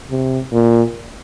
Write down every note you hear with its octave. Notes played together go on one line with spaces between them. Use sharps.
C3
A#2